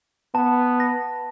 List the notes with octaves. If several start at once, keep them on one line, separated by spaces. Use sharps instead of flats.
B3 A5
A#6